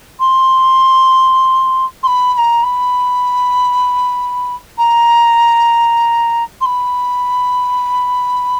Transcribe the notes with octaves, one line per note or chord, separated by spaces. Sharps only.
C6
C6
B5
B5
A#5
B5
A#5
C6
B5